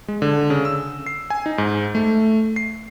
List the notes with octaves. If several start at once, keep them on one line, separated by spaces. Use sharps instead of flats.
G#3
D3
C#3
E6
C7
G#5
D#4
G#2
A3
C7